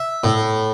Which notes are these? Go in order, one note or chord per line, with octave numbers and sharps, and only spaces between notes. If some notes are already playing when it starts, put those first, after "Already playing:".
Already playing: E5
A2